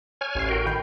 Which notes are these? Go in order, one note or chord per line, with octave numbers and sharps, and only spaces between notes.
C#5 G#5 F6
A1 C7
F#4 A#4 G5
D#3 G5 B5 G6